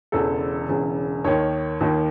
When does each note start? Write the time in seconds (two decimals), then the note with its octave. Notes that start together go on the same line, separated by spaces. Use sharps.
0.12 E1 E2 C#3 A4
0.69 E1 E2 C#3
1.24 D#2 D#3 C#5
1.81 D#2 D#3